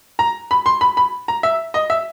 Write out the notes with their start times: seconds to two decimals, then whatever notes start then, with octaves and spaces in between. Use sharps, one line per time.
0.19 A#5
0.51 B5
0.66 C6
0.81 B5
0.97 B5
1.28 A#5
1.43 E5
1.74 D#5
1.90 E5